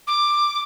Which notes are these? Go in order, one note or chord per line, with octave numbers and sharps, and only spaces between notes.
D6